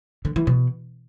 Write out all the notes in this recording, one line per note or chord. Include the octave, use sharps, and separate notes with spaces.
D3
E3
B2